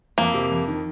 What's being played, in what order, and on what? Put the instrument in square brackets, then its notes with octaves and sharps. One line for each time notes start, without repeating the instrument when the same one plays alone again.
[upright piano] F2 [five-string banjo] A#3
[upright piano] C3
F2
D#3